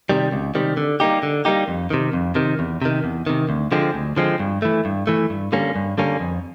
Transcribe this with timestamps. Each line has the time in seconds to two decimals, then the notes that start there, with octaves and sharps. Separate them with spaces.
0.09 C3 D#3 G3
0.32 C#2
0.55 C3 D#3 G3
0.77 D3
1.00 G3 A#3 D#4 G4
1.23 D3
1.45 G3 A#3 D#4 G4
1.68 F2
1.90 C3 D#3
2.13 F2
2.35 C3 D#3
2.59 E2
2.82 C3 D#3
3.04 E2
3.27 C3 D#3
3.49 D2
3.72 D3 F3 G#3 C4
3.94 D2
4.17 D3 F3 G#3 C4
4.40 G2
4.62 E3 A3
4.85 G2
5.07 E3 A3
5.30 G2
5.52 D3 G3 A#3 C#4
5.76 G2
5.98 D3 G3 A#3 C#4
6.20 F2